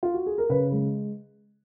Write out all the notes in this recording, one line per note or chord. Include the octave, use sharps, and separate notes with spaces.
F4
F#4
G#4
A#4
C#3 B4
G#3